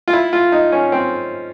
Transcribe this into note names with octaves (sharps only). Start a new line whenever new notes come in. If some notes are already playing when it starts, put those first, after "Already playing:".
F4
E4
F4
D#4
C#4
C4